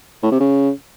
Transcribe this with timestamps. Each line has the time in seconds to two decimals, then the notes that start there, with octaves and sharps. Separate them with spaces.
0.23 A2
0.32 C3
0.40 C#3